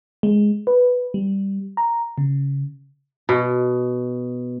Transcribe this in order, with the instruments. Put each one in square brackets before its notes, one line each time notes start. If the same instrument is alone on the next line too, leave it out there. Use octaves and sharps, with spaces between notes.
[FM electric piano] G#3
B4
G3
A#5
C#3
[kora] B2